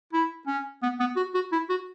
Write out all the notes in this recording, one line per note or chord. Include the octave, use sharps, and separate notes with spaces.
E4
C#4
B3
B3
F#4
F#4
E4
F#4